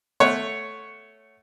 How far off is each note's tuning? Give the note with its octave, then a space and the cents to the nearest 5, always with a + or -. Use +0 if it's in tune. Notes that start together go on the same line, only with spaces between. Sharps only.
A3 +0 C#5 +0 F#5 +0